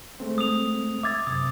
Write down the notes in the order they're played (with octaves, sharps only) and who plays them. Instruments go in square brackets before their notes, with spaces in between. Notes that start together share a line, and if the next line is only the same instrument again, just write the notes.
[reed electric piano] G#3 A3 C4
[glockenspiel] D#6 F7
[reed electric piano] E5 G#6 [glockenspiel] D6 E6 A6
[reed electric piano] F#2 C3 [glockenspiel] D#6